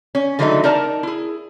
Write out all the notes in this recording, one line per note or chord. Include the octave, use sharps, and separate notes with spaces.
C#4
D3 E3 F#3 G#3 A3 D#4
D#4 A#4 D5 A5 A#5
E4 G#4